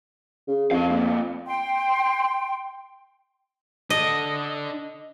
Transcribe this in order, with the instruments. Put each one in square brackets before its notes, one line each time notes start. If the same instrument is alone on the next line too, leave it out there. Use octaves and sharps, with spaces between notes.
[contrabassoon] C#3
[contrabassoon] F2 [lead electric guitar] D4 F5
[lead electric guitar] C3 A#3
[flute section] G5 C6
[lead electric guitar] D4 A4 [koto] D#5